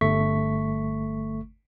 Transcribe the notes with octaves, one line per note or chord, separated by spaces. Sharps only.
G1 A3 C#6 B6